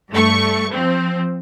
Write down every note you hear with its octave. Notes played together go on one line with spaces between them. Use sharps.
G2 A3 C#6
F3 C4